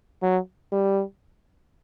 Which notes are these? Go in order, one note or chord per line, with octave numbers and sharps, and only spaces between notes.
F#3
G3